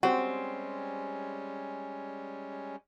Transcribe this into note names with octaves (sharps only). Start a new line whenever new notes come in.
G3 G#3 C4 C#4 F#4 G4 C5